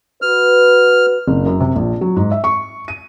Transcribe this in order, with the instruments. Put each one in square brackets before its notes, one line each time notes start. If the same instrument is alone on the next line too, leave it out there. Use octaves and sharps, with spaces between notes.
[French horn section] F#4 B4 [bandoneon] F6
[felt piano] F#1
F#2
C3
A#1
F#3
G#2
E5
C#6
D#7